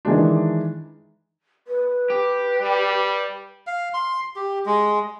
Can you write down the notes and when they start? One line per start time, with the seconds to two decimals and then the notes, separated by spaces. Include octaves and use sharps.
0.05 D#3 E3 G#3 D4
1.67 B4
2.10 G4
2.61 G3
3.67 F5
3.94 C6
4.36 G4
4.66 G#3